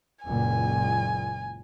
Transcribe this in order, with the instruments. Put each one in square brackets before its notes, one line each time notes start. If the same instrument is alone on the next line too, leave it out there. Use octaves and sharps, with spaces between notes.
[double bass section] F#1 C#2 A#2 [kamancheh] G#5